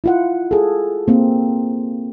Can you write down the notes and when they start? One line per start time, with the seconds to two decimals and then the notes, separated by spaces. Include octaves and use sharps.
0.04 E4 F4 F#5
0.51 G#4 A4
1.08 A#3 C4